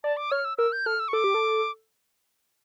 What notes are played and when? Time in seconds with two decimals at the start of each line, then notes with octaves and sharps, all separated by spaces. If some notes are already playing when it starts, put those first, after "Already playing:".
0.04 D5 A5
0.17 D6
0.31 C#5 F6
0.45 E6
0.58 A#4 E6
0.72 G6
0.86 A4 F6
1.00 E6
1.08 C#6
1.13 A4 D6
1.24 G4
1.34 A4